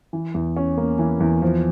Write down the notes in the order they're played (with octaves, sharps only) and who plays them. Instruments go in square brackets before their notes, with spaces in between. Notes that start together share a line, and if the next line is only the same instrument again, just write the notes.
[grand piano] E3
E2
C#4
A#3
E3
E2
F3